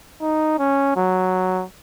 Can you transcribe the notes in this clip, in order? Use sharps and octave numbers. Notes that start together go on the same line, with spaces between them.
D#4
C#4
F#3